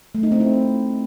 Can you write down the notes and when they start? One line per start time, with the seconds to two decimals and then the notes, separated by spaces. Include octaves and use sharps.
0.15 A3
0.23 D#4
0.32 C4
0.40 E4